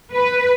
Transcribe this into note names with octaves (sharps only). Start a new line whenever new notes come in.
B4